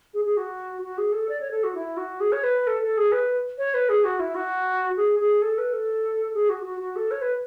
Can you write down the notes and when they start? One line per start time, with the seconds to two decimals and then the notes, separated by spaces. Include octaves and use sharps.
0.14 G#4
0.25 G#4
0.37 F#4
0.83 F#4
0.98 G#4
1.12 A4
1.29 D5
1.40 C#5
1.51 A4
1.63 F#4
1.75 E4
1.97 F#4
2.20 G#4
2.32 C#5
2.43 B4
2.67 A4
2.82 A4
2.97 G#4
3.12 B4
3.58 C#5
3.74 B4
3.89 G#4
4.04 F#4
4.19 E4
4.34 F#4
4.97 G#4
5.20 G#4
5.42 A4
5.58 B4
5.73 A4
6.34 G#4
6.49 F#4
6.64 F#4
6.80 F#4
6.96 A4
7.11 C#5
7.21 B4